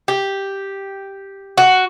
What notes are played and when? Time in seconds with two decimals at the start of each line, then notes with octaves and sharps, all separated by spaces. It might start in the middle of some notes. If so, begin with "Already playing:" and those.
0.08 G4
1.58 F#4